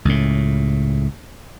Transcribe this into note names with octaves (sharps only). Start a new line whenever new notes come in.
C#2 A2